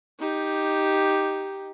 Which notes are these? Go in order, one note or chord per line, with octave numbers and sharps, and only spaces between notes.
D#4 G4